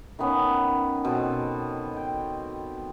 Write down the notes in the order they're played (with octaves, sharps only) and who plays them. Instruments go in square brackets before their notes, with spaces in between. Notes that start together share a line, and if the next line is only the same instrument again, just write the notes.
[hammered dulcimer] D#3 A#3 B3 C#4
B2 C4 A4
G5